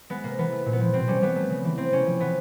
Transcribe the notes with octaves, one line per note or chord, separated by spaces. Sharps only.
G#3 B3
C3 A#3
E3 B3
A3
A#2
B3
F3
B2 C4
G3 C#4
G3 B3
A3
C#3
E3
A3 C4
C3 C#4
F3
A3 B3